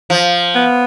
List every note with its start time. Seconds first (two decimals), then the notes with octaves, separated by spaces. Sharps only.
0.10 F3
0.55 B3